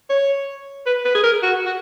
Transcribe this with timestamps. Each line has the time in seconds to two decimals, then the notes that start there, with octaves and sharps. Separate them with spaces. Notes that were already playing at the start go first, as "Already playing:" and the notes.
0.10 C#5
0.86 B4
1.05 B4
1.15 G#4
1.24 A#4
1.43 F#4
1.66 F#4